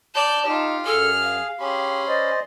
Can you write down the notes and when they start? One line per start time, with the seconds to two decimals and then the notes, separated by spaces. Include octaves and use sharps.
0.14 D5 A5 G6
0.46 D#4 F4 G4
0.86 F#2 G#4 A4 F6
1.22 F5
1.60 C#4 G4 G#4 B5 C6
2.08 C5 D5 D#5